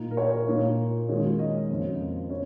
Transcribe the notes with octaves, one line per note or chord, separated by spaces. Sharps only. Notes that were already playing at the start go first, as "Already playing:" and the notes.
Already playing: A#2 A#3 D#4
A#4
C#5
A#2 A#3 D#4
D#3 G#3 C#4
D#5
F2 C#3 A#3
C#4